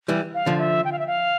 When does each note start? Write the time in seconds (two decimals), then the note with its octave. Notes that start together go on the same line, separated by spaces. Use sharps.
0.08 E3 G3
0.35 F5
0.46 D3 F3
0.59 E5
0.85 G5
0.92 F5
0.99 E5
1.07 F5